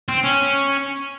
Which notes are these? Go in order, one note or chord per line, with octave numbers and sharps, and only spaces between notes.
C4
C#4